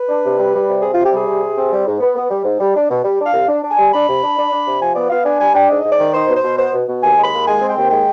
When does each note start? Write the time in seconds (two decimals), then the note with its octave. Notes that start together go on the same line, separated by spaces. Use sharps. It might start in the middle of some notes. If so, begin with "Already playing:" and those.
Already playing: B4
0.09 D4
0.24 C3
0.39 G3
0.54 G3
0.68 C3
0.82 C4 G#4
0.94 C3 F4
1.05 G4
1.12 G3 G#4
1.27 C3
1.42 C3
1.57 C4
1.72 G3
1.86 G#2
2.00 B3
2.16 B3
2.30 G3
2.45 G#2
2.60 G3
2.75 D4
2.90 B2
3.04 G3
3.20 D4
3.26 F5
3.33 C2
3.48 D4
3.63 D4
3.71 G#5
3.79 G3
3.93 D4 B5
4.08 C3
4.22 D4
4.36 D4
4.52 D4
4.67 C3
4.81 F3 G#5
4.95 B3 D5
5.10 B3 F5
5.25 D4 G#5
5.40 G3 G#5
5.55 D4 G5
5.70 G#2 D#5
5.84 G#2
5.92 D5
5.99 D#3
6.14 D#4 C5
6.29 B2
6.36 C5
6.44 B2
6.59 B3 C5
6.74 B2
6.87 B2
7.03 D#2 G#5
7.17 G#3
7.24 B5
7.32 D#2
7.47 G#3 G#5
7.61 C4
7.70 G5
7.76 D#2
7.91 G#3 G5